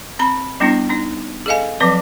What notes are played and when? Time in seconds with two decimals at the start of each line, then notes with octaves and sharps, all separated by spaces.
0.19 C4 A#5 B5
0.60 G3 B3 C#4 D4 E4
0.89 C#4 D#4
1.46 G#4 A4 D#5 F5 G#5
1.80 F3 F#3 C4 B4 D6